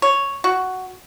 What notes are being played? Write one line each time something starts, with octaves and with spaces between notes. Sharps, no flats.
C#5
F#4